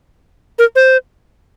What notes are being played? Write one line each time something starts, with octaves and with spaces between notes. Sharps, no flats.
A#4
C5